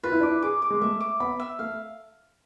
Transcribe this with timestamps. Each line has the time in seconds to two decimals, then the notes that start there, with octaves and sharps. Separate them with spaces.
0.03 F4 B4
0.12 E4
0.20 D4 D6
0.30 E4
0.43 G#4 D6
0.62 D6
0.70 G#3
0.82 A3 E5
1.01 D6
1.20 B3 B5
1.40 E5
1.59 A3 F5